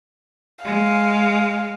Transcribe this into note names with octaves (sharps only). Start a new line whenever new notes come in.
G#3 F5